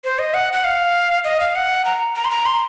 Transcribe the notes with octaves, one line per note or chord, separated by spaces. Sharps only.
C5
D#5
F#5
F#5
F5
D#5
F5
F#5
A#5
A#5
C6
A#5
C6